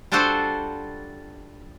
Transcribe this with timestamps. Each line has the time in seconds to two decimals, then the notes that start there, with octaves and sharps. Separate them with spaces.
0.12 G3 D4 F4 F#4 A4 C5